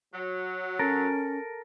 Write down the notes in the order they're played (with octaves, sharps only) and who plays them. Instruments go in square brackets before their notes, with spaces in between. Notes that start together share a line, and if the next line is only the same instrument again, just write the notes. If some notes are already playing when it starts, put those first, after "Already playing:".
[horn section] F#3
[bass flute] C#4 [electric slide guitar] A4 A#4